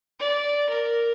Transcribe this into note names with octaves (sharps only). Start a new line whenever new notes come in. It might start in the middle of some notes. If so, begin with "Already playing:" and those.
D5
A#4